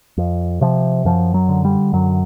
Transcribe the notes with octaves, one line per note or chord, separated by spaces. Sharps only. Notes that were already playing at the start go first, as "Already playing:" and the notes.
F2
C3 F3
F#2 F3
F#3
D3
G3
F#2 F#3